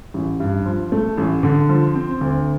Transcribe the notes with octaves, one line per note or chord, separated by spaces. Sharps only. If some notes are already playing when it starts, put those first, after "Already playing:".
A1
G2
F3
A3
A1
D3
F3
C4
D2